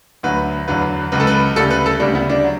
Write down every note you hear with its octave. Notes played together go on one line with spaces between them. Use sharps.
D2 D3 F#3 B4
E2 D3 F#3 B4
C#2 C#3 F#3 B4
A4
B4
D2 C#3 G3 A4
B4
A4
D2 C#3 G3 D4
B3
D4
F#3